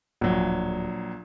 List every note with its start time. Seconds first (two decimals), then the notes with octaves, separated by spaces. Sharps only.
0.21 D1 A#1 F#3